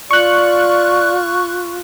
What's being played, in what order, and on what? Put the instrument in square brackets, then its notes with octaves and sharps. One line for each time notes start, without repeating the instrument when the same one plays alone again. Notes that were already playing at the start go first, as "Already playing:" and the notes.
[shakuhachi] F4 [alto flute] D5 [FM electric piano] C#6 F#6